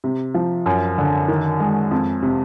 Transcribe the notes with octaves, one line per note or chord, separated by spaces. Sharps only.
C3
F3
F#2
D3
D#3
G#3
F2
C3